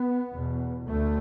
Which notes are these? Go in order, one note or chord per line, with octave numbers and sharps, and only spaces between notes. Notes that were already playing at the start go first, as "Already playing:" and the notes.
Already playing: B3
E2 B2
D2 A3